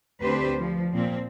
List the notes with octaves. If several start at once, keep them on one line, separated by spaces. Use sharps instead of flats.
D2 C4 D4 G4 B4 C5
F3
A#2 F3 C4